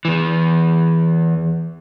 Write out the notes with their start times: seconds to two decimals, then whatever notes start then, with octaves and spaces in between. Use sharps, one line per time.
0.05 E2 E3